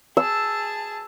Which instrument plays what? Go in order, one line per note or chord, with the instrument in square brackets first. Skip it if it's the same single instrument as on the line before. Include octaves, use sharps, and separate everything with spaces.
[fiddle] G#4 A5 [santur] E6